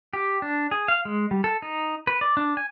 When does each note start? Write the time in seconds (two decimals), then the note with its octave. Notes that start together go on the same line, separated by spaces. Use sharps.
0.13 G4
0.42 D4
0.71 G#4
0.88 F5
1.05 G#3
1.31 G3
1.44 A4
1.62 D#4
2.07 B4
2.21 D5
2.37 D4
2.57 G#5